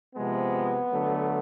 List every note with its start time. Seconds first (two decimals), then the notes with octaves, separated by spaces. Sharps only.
0.15 C3 F3 G#3 B3
0.90 D3 F#3 A3